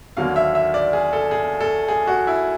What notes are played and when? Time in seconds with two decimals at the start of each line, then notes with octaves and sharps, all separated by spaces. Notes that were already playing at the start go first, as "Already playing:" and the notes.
0.17 D#2 D3 F#3 A#3 F5
0.36 E5
0.55 E5
0.74 D5
0.93 G#4
1.13 A4
1.31 G#4
1.61 A4
1.89 G#4
2.07 F#4
2.27 E4